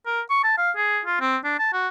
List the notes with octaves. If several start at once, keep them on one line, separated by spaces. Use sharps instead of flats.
A#4
C#6
A5
F5
G#4
F4
C4
D4
A5
F#4